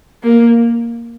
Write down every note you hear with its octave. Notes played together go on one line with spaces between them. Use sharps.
A#3